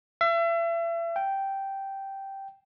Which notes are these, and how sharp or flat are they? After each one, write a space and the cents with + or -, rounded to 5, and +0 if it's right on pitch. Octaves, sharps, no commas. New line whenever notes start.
E5 +35
G5 -5